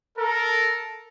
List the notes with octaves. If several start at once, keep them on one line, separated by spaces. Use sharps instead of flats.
A4 A#4